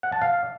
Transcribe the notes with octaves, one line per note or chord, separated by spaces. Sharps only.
F#5
A5
F5